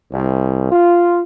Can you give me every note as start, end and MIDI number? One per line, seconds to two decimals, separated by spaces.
0.12 0.69 36
0.71 1.21 65